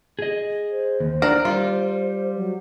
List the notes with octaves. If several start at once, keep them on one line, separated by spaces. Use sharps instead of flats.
G#4 D#5
C5
D#2
D4 A#4 D5
G3 F4
F#3